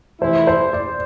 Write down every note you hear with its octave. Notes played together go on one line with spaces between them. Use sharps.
F2 C3 E3 A3 E4 C5
C5
D5